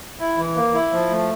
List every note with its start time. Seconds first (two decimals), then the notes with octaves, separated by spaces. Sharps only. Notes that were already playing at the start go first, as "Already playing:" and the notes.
0.19 E4
0.38 E3
0.56 A#3
0.74 E4
0.92 F3
1.10 A3